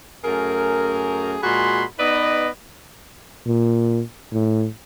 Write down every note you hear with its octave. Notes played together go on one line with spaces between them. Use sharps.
F#2 A3 G#4 A#4
A#2 G#3 F#4 G#4 B5 C6
B3 D#4 B4 D5 D#5
A#2
A2